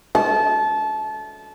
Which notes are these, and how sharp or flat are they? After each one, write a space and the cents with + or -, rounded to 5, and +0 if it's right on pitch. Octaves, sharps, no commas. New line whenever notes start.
A5 -25